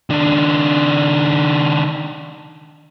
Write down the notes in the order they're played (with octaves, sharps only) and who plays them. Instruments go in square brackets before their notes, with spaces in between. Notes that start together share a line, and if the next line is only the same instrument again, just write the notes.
[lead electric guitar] D#3 D4